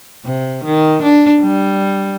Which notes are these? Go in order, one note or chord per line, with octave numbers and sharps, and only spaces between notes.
C3
D#3
D4
G3